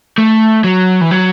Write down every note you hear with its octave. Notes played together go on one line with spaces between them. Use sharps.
A3
F#3
E3
F#3